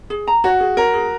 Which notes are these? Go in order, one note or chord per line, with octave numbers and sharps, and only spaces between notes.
G#4
A#5
F#4 C#5
G#4
A#4 C#5
G#4